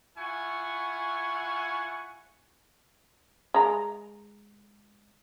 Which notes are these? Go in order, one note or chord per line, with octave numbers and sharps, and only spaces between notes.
E4 F4 F#5 G#5 C#6
G#3 A#5